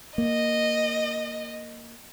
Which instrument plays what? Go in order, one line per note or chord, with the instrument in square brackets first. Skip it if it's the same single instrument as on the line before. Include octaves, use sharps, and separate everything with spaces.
[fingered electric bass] A#3 [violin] D#5